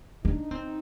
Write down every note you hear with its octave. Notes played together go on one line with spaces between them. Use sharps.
D4 D#4
C4